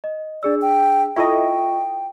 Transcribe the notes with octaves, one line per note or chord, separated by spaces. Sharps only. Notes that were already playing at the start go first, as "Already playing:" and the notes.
D#5
D4 G#4 D5 E6
G5
E4 F4 A4 D#5 G5 C#6